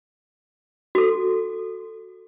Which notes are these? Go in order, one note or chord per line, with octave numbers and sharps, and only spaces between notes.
F#4 A4